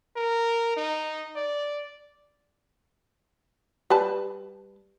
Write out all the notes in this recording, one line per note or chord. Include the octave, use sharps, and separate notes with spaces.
A#4
D#4
D5
G3 B4 A5